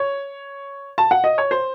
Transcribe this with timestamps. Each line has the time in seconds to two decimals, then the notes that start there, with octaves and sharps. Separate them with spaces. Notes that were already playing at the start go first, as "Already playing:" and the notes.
Already playing: C#5
0.98 A5
1.11 F#5
1.24 D#5
1.38 C#5
1.51 C5